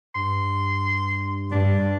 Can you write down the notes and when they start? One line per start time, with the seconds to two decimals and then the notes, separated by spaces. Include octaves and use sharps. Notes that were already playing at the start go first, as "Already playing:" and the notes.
0.15 G2 C6
1.51 G2 D4